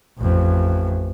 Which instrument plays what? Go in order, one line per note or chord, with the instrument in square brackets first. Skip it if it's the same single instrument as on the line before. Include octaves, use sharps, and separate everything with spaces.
[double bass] A1 F2